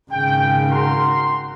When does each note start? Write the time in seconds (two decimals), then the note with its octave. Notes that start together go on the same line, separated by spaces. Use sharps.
0.10 G#1 C#3 G5
0.70 F#4 A#4 C6